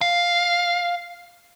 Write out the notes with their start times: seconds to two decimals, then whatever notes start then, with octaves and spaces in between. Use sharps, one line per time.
0.01 F5